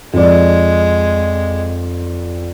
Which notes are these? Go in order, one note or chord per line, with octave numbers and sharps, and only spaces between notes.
F2 G#3 D5